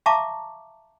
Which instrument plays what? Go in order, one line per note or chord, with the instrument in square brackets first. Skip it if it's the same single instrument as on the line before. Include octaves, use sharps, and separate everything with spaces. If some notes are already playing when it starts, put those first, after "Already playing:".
[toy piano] E5 F5 A5 A#5 C#6 D6